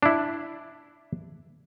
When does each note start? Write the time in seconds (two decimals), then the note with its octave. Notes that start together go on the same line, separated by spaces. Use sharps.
0.03 D4 E4